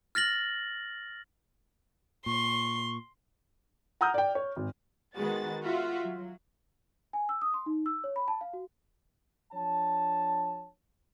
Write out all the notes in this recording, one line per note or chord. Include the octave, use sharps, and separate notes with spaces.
F6 A6 A#6 F#7
A#2 C6 C#6
F#5 A#5 D#6 F6 G6
D5 G5
C#5
G#1
D#3 G#3 B3 F#4 A6
F4 F#4 E5
F#3
G#5
E6
D#6
C6
D#4
E6
C#5
B5
A5
F5
F#4
F3 D4 C#5 A5